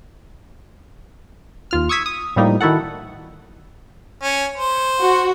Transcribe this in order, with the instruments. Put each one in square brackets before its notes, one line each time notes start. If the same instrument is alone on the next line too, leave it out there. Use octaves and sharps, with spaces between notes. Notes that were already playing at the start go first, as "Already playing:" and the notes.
[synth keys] D#2 F4 F6
C#6 D#6 E6 G#6 B6
D#6
A2 F3 G3 A#3 D#4
D#3 E4 F#4 A4 F#5
[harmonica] C#4
C5
[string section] F#4